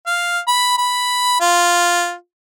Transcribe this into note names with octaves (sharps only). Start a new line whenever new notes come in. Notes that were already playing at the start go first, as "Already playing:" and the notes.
F5
B5
B5
F4